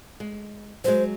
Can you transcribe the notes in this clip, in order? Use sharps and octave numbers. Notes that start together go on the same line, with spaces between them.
G#3
F#3 G#3 C5